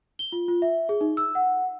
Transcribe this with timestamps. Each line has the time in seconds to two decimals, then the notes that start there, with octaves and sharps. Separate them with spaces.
0.19 G7
0.32 F4
0.48 F4
0.62 E5
0.89 G#4
1.01 D#4
1.17 E6
1.35 F#5